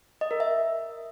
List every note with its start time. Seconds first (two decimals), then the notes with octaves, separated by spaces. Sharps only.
0.21 D#5
0.31 A#4
0.40 E5